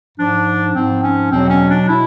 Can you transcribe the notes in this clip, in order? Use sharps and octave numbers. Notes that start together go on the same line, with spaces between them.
G#2 F3 D4
G#2 F3 C4
C#4
E2 B2 F#3 C4
C#4
D4
B2 E4